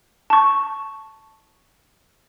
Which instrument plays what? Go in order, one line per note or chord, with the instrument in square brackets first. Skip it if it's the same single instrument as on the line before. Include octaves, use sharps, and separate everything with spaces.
[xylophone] A5 C#6